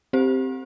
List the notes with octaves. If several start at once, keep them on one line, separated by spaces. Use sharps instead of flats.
C4 G4 C5